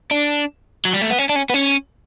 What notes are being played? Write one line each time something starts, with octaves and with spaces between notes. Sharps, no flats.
D4
F#3
G3
A3
B3
C#4
D4
C#4
B3
C#4